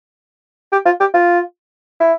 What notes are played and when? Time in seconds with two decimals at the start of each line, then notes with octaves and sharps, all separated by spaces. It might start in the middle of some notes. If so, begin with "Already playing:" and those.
0.72 G4
0.85 F4
1.00 G4
1.14 F4
2.00 E4